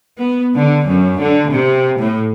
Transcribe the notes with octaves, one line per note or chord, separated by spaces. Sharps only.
B3
D3
F#2
D3
C3
A2